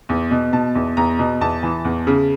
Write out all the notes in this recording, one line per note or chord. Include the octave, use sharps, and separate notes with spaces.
E2
B2
B2 A5
E2
E2 A#5
B2
E2 A5
E3
E2
C#3